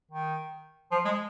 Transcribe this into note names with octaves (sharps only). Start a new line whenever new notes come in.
D#3
F3
G#3